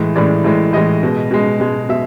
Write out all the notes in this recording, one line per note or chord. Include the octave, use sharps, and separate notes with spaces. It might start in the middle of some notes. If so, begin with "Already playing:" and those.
Already playing: A2 E3 G#3
A2 E3 G#3 D5
A2 E3 G#3
A2 E3 G#3 D#5
B2 G#3
B2 G#3
B2 G#3
B2 E5